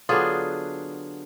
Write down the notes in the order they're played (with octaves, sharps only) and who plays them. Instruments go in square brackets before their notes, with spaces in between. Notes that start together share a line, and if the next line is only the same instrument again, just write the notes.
[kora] D3 F#3 B3 D4 F4 G#4